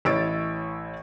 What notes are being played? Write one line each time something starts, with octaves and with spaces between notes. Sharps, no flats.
A1 E4 C#5 E6 A6 D7